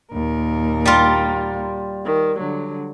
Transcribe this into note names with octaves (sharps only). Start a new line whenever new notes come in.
D#2 A#2 A#4
G3 F4
D#3
D3 F#3